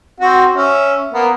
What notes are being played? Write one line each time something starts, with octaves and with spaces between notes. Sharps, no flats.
C4 F#4
C#4 E5
A#3 B3